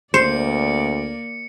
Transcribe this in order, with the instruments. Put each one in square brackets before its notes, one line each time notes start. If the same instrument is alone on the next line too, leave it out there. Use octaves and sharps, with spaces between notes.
[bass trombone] D2 [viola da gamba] A#3 D5 [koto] C5 [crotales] C#7